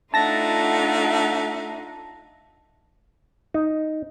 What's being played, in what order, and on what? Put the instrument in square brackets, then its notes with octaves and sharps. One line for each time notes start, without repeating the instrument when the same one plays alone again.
[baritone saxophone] A3 [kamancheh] D4 F#5 [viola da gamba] D#4 F4 [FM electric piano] A5 A#6
[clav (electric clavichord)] D#4